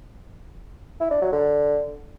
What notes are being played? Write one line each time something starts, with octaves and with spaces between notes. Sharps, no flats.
E4
D4
F#3
D3